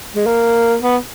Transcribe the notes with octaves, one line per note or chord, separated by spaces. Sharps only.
G#3
A#3
B3